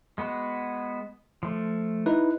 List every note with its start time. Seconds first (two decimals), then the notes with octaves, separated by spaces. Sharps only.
0.18 G#3 B3 F#4
1.43 F3 A3
2.06 D#4 E4 B4